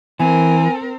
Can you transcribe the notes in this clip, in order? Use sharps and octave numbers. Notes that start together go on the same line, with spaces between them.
E3 C4 A#4 G#5